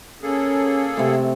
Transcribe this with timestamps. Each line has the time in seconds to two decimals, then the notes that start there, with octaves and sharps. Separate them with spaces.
0.22 A#3 C#4 G#4 A4
0.97 C3 A3